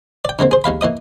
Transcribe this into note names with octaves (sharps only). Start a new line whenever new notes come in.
D5 G5
D3 G#3 A#3 C4
G#4 C5
D#2 G#3 F5 B5
E3 A#3 D#5 D#6